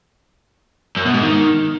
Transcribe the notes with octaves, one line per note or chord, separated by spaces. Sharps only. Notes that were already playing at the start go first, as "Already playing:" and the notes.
F#2
B2
G#2
D#3